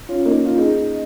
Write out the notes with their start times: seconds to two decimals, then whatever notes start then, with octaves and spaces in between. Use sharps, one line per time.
0.09 C#4 F4
0.25 A#3 D#4
0.46 F4
0.57 D#4 G#4